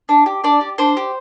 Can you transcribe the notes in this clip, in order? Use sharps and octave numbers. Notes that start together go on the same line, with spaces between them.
D4
G4
D4 D5
G4
D4 C5
G4